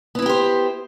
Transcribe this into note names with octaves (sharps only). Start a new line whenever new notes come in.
B3 E4 G4 A#4 C5